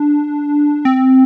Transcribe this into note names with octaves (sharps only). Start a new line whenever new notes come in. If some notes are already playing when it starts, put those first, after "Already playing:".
Already playing: D4
C4